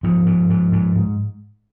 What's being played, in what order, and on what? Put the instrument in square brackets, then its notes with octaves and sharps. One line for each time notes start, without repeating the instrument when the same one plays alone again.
[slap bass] G#2 F3
G#2
G#2
G#2
G#2